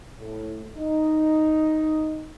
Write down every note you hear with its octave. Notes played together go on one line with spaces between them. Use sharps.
A2
D#4